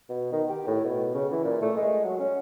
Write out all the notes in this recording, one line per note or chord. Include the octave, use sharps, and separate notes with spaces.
B2
D#3
G4
A2
B2
C#3
E3
A#2
A3
G#3
F#3
C#4